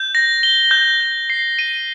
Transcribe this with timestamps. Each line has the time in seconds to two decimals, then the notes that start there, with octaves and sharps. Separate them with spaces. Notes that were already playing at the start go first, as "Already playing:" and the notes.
Already playing: G6
0.15 A#6
0.43 G7
0.71 G6
1.00 G6
1.30 C7
1.59 D#7